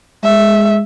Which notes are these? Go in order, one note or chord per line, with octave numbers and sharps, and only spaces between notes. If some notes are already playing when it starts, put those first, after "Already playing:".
G#3 E5